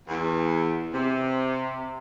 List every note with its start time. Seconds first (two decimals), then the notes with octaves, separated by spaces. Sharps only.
0.09 E2
0.93 C3